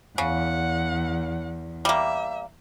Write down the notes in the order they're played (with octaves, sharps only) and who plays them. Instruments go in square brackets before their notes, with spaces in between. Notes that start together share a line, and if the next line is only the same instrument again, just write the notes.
[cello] E2 [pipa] C#3 [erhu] F#5
[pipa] G3 A#3 [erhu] E5